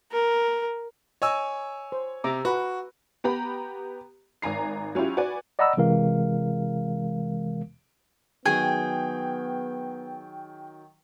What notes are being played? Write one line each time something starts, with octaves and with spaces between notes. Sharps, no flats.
A#4
C#5 D#5 G#5 E6
C5
C3 E5 A#5 D6
F#4 B4
B3 G4 A#5 B5
G#1 G#5 A#5 C7
F#3 C#4 E4 F4 G4
F#4 B4 D5 G#5
D5 D#5 F#5 A#5 B5 E6
C3 E3 G#3 A#4 F5
D#3 F#3 B3 G#4 G5